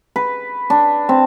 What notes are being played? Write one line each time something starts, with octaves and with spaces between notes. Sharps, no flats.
B4
D4
C4